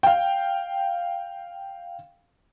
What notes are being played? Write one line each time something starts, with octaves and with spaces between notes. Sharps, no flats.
F5 G5